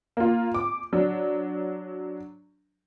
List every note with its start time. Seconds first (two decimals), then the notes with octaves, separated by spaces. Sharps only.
0.17 A#3 F4
0.54 D6
0.93 F#3 D4